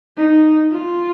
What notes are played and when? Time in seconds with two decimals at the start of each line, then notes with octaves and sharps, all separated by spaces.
0.17 D#4
0.71 F4